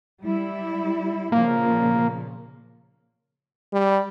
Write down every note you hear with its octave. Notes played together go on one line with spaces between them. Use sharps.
G3 E4
A#2 C#3 F3 A#3
G3